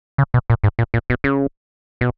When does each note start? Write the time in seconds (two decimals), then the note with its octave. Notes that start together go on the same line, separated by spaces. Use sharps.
0.18 C#3
0.34 B2
0.50 A#2
0.64 G#2
0.79 A#2
0.94 A#2
1.10 B2
1.24 C#3
2.01 B2